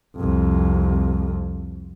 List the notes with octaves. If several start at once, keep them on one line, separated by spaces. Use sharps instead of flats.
C2 F2